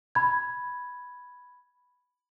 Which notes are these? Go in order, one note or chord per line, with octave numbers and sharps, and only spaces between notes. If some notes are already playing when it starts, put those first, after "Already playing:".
B5 G#6